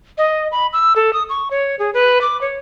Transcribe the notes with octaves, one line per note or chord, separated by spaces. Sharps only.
D#5
B5
E6
A4
D#6
C#6
C#5
G#4
B4
D6
C#5